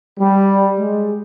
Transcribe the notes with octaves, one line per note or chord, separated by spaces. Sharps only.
G3
G#3